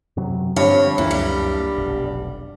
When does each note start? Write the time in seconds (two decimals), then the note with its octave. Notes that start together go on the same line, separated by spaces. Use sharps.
0.17 F#2 C3 F#3
0.56 G2 D3 F3 G3 C4 C#5
0.98 C#2 F#2 E3 A#3
1.11 G3
1.77 F1 B1